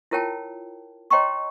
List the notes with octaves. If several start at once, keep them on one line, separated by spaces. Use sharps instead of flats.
E4 F4 A#4 C#5 G5 A5
C#5 D#5 G5 A#5 C6 C#6